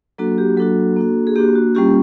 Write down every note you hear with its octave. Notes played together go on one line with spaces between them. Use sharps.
F#3 A#3 D4 F#4 A4
G4
F#3 A#3 D4 F#4 A4
A#3 D4 F#4
G#4
A#3 D4 F#4 G4
F#4
G3 A#3 C#4 F4 G4